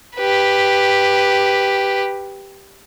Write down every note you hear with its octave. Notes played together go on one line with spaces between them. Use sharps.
G4 B4